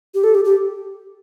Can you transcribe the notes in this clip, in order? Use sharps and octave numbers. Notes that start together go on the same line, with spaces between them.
G4
A4
G4
G4